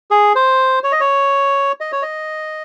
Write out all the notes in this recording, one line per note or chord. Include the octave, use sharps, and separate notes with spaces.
G#4
C5
C#5
D#5
C#5
D#5
C#5
D#5